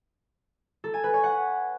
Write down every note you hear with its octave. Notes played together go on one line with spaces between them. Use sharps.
A4
G#5
B4
C#5
F#5